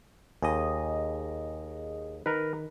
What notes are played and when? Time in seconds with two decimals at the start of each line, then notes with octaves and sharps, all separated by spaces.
0.42 D#2 G#4 D#5
2.26 D#3 A#4 B4